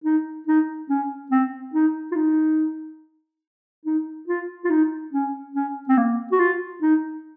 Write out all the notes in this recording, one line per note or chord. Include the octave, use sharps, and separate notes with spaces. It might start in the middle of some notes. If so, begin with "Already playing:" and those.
D#4
D#4
C#4
C4
D#4
F4
D#4
D#4
F4
F4
D#4
C#4
C#4
C4
A#3
F#4
F4
D#4